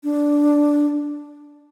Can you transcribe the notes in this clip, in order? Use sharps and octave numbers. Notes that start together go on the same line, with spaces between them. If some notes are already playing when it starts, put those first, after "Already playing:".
D4